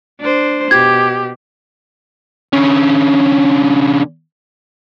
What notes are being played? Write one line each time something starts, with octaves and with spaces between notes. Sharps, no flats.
D4 C5
B2 G4 G#6
D3 C#4